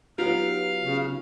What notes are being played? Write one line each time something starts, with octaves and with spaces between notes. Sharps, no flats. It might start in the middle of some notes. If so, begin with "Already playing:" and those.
F#3 B3 D#4 F4 G4 F5
C#3